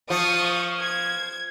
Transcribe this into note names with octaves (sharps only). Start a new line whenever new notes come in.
F3 F5 C#6 D#6
G#6